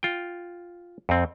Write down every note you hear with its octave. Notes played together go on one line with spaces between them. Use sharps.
F4 G5
F2 C4